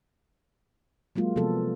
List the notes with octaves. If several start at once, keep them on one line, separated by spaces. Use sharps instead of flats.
F#3 G#3 A#3 F4
C3 F3 A#3 B3 A4